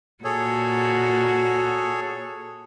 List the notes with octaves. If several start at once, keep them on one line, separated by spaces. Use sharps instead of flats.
A#2 F#4 G#4 A4 C#5